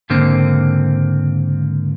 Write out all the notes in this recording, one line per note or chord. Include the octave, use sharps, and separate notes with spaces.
C#2 G#2 D3 A#3 C4